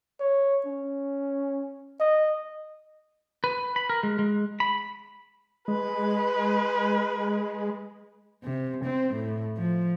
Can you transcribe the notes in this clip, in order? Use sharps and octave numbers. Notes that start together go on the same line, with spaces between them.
C#5
C#4
D#5
B4
B5
A#4
G#3
G#3
B5
G#3 B4
C3
C4
A2
F3